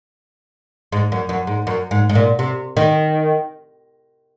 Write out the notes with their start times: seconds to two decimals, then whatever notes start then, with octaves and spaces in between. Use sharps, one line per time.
0.92 G#2
1.12 F#2
1.29 F#2
1.47 G#2
1.67 F#2
1.91 G#2
2.09 G#2
2.15 A#2
2.39 C3
2.77 D#3